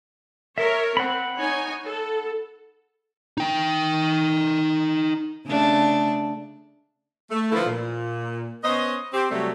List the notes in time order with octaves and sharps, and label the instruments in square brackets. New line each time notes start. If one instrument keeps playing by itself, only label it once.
[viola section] A#4 C#5 [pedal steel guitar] E5
[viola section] C4 [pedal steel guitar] F#5 B5
[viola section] D#4 C#5 G#5
A4
[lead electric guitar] D#4 G5
[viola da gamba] C#3 A3 D4
[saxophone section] A3
D3 F3 A#3 E4 A4 B4
A#2
B3 C#4 C5 D#5
C4 G4
C3 F#3 G3 A3